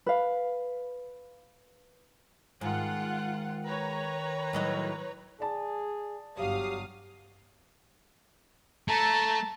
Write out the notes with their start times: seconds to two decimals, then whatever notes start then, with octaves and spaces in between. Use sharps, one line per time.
0.06 B4 F5
2.61 G#2 D#3 F4 F#5
3.66 B4 C#5 A#5
4.53 A2 F#3 D#4
5.40 G#4 D5 A5
6.38 G1 F#3 G4 F5 D#6
8.88 A3 A5 A#5